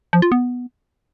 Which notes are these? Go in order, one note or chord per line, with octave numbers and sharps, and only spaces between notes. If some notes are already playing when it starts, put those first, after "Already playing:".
F3
F4
B3